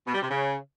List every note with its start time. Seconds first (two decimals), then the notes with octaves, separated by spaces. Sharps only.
0.07 B2
0.15 G3
0.22 C3
0.30 C#3